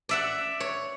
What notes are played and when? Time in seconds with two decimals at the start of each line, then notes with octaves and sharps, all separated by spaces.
0.09 D5 E5 F#5
0.60 C#5